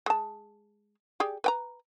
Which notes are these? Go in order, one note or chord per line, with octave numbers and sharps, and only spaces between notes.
G#3 A5
G4 G#4 D5
B4 G5 A#5